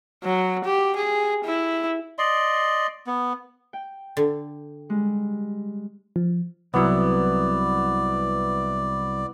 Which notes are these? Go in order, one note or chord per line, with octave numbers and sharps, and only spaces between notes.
F#3
G4
G#4
E4
D5 D#5 C6
B3
G5
D3
G3 G#3
F3
C2 F#3 B3 E4 D5